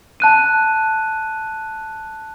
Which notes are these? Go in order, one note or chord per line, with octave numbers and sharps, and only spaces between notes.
A5 F#6 D#7